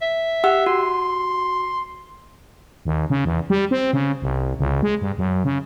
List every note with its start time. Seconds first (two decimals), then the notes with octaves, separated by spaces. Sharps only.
0.02 E5
0.44 G4 F#5 E6
0.66 F#4 C6
2.85 D#2
3.10 C#3
3.25 E2
3.50 G3
3.71 C4
3.93 C#3
4.22 C2
4.59 C#2
4.83 G#3
5.01 G2
5.18 F#2
5.45 C#3